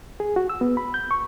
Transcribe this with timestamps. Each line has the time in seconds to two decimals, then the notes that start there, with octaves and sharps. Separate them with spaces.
0.20 G#4
0.36 F#4
0.50 E6
0.61 B3
0.77 B5
0.94 G6
1.11 C#6